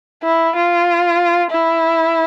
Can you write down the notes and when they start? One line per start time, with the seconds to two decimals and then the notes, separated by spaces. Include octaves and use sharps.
0.23 E4
0.55 F4
1.51 E4